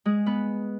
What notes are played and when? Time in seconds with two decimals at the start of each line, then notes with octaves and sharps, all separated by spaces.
0.05 G#3 G#4
0.26 B3 B4